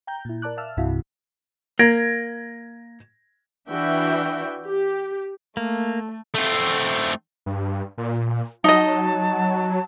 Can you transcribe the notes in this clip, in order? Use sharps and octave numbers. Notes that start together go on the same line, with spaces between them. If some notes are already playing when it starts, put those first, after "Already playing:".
G5 A#5 G6
A#2 E4
A#4 D5 A5 D6 F#6
E5 F5 A5 E6 F6
C2 G2 C3 E4 F#4 F5
A#3 G#6 A#6 D7
E3 D4 F#4 E5 G5
G4
A3 A#3
A3 C4
G2
A#2
F#3 D#4 D#5 A5